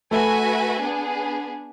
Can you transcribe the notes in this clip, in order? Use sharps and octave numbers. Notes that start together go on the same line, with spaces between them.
A3 F#4 A4 B4 E5 G#5
B3 D4 G#4